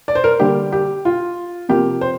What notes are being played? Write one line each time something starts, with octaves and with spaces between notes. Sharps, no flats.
D5
C5
A#4
D3 G3 A#3 G4
G4
F4
C3 F3 A#3 G4
C5